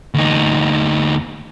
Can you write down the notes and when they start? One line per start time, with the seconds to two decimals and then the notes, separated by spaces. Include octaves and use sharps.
0.14 D2 D#4